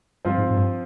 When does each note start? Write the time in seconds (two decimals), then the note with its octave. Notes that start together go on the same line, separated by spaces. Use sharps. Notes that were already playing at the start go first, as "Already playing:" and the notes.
0.25 G2 F3 C4 F4
0.38 G#2
0.50 G#2
0.57 G2